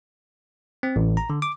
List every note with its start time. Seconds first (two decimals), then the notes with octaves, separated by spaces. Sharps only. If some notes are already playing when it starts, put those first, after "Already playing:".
0.83 C4
0.96 A1
1.17 A#5
1.30 D3
1.42 D6